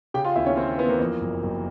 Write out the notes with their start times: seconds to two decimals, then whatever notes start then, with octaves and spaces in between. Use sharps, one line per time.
0.14 C#3 G4 G5
0.25 F4 F5
0.35 D#2 E4 E5
0.46 C#4 C#5
0.57 D#2 C4 C5
0.78 E3 B3 B4
0.89 A#3 A#4
1.00 F2
1.21 F#1
1.43 F#1